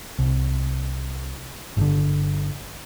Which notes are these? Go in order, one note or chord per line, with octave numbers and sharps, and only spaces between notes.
C2
G1 D3